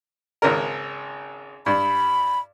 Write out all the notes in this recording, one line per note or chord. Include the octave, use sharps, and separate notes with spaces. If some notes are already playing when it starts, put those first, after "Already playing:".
G#1 C#2 A#4
G2 B5